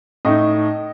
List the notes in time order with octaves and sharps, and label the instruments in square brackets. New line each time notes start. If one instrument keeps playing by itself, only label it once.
[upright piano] A2 A3 D#4 D#5